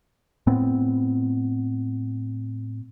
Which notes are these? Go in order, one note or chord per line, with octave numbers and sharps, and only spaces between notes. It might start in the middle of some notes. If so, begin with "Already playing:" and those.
A2 B3 C4